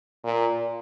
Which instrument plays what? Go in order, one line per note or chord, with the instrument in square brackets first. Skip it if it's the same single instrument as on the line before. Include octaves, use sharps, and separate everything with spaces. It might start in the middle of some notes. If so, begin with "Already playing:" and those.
[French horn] A#2